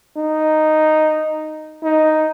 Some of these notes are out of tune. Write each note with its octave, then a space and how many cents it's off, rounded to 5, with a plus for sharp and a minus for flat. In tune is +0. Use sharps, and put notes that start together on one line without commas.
D#4 -5
D#4 +0